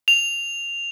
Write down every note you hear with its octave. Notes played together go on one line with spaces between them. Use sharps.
F7